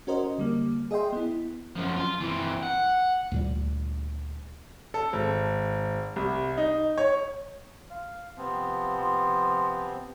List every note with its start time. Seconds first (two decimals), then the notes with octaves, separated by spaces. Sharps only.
0.07 C#4 F#4 A#4 C5 D#5
0.38 D3 G3 A#3
0.91 G#4 D#5 E5 G5 C6
1.13 B3 E4
1.76 F#2 F3
1.96 F4
2.20 E3 C4
2.63 F#5
3.32 D2 A#2 G3
4.94 A4
5.13 G#1
6.16 C2
6.58 D#4
6.98 C#5
7.91 F5
8.38 C3 F3 B3 C4
8.96 F3